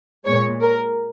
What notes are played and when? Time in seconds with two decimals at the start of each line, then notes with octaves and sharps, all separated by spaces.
0.25 A#2 G#3 C#5
0.62 A#4